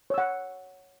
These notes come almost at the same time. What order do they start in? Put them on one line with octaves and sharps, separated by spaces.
C#5 E6 F#5